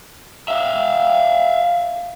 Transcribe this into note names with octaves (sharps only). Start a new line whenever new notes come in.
E5 F5